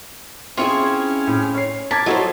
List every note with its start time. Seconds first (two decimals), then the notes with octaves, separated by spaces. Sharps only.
0.57 C4 C#4 E4 F4 G#4 C#6
1.27 A2
1.55 C#5 C7
1.91 A#4 A5 D6 G#6 B6
2.06 F#3 E4 F4 A4 C5 D#5 F#5